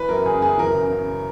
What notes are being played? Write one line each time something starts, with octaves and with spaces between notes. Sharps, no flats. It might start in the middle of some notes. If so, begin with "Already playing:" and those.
Already playing: E3 B4
F#2 A#4
C#3 G#4
F#2 G#4
E3 A#4
C#3
C#3